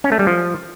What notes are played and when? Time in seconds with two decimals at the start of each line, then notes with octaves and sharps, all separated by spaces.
0.04 C#4
0.12 A3
0.19 G3
0.27 F3